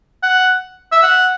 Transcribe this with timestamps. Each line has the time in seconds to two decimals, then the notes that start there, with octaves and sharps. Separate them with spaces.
0.23 F#5
0.92 E5
1.03 F#5